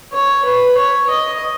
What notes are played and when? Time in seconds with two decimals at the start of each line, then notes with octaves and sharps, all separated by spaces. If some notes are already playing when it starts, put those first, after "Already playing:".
0.13 C#5
0.45 B4
0.77 C#5
1.10 D#5